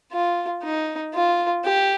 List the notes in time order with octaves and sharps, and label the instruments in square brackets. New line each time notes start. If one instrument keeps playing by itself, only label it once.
[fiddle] F4
D#4
F4
G4